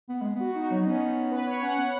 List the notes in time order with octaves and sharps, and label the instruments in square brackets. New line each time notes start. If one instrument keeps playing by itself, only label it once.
[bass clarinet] B3
G#3
[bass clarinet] B3 [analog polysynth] F#4
[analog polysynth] D#4
F#4
[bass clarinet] F#3 [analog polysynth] D#4
[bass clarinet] B3 [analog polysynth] C#4
[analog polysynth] B4
C#5
[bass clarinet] C#4 [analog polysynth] F#5
[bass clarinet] B3 [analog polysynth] F#5